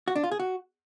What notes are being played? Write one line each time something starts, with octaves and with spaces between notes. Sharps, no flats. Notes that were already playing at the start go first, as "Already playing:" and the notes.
F#4
D4
F4
G#4
F#4